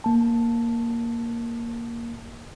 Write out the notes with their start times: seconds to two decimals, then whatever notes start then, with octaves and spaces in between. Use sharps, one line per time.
0.04 A#3 A5